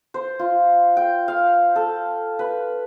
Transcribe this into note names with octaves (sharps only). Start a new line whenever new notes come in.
C5
F4
G5
F5
A4
B4